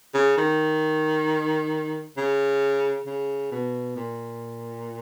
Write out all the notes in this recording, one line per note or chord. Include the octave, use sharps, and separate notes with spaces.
C#3
D#3
C#3
C#3
B2
A#2